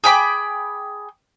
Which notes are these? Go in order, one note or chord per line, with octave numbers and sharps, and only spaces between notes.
G#4 G5 B5 D6